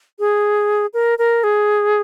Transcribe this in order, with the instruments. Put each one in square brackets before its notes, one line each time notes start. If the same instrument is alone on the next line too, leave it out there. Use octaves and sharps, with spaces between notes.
[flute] G#4
A#4
A#4
G#4